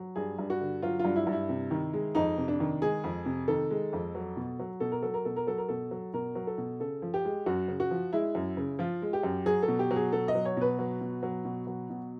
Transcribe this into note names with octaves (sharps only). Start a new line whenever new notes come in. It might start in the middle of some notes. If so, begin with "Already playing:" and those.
Already playing: F#3
G2 G#4
G2
F#4
D3
F#3 F4
F4
G2
E4
G2
E4
C3
D#3
G#3
F2 D#4
C3
D4
D#3
G#3 G#4
F2
C3
D#3 A4
G#3
F2
F#3
B2
F#3
B2 A4
A#4
F#3 A4
A#4
B2 A4
A#4
F#3 A4
A#4
B2 A4
F#3
B2 A#4
F#3
A4
B2
C#3 A4
F3
G4
G#3
F#2 F#4
C#3
F#4
F3
G#3 E4
F#2
C#3
F3 F4
G#3
G4
F#2
F#3 G#4
A4
B2
G4
F#3
G#4
B2 A4
D#5
F#3
C#5
B2 B4
F#3
B2
F#3
B2
F#3
B2